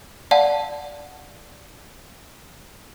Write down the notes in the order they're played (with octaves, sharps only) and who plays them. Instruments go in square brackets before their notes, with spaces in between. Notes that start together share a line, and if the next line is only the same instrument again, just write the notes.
[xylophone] D5 F5 F#5 A5